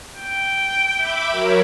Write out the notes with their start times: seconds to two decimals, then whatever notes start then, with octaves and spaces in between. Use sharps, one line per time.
0.15 G5
0.96 E5 B5 D6
1.29 F#3 A#4 C#5